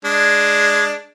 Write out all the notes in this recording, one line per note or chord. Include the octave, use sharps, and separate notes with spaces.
G#3 D4